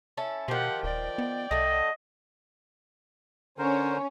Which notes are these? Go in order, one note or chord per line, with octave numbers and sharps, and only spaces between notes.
C#4 E4 A4
B2 D#3 F3 G4 F#5
D#1 D5 G5
B3
C2 D3 A3 D#5
D3 C#4 A#4 C5